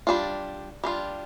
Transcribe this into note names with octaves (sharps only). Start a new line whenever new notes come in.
G3 D4 F4
G3 D4 F4